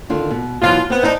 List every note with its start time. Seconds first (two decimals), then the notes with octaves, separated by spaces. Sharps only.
0.09 D3 D#3 F4
0.30 B2
0.62 B2 E3 F#3 F4
0.90 B3 C4
1.03 D#4 E4 C5 D5 A5